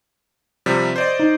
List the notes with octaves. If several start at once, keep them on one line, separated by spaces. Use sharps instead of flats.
C3 F3 G3
C5 D5 D#5
D#4